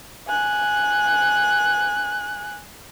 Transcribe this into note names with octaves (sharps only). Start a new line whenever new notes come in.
G#5 F#6